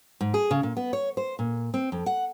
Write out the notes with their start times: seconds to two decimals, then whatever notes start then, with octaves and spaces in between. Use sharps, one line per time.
0.21 G#2
0.34 G#4
0.51 C#3
0.63 A#2
0.77 B3
0.93 C#5
1.17 C5
1.39 A#2
1.74 C4
1.92 F2
2.06 F#5